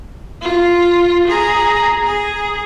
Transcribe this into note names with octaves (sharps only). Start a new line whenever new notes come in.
F4
G#4 A#5
G#4